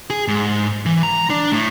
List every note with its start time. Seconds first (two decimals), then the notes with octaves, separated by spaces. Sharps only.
0.10 G#4
0.28 G#2
0.86 E3
1.03 A#5
1.30 D4
1.53 A2